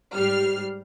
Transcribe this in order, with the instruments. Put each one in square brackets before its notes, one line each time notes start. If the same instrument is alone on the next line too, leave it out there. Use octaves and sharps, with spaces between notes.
[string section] G#2 G3 F6 C7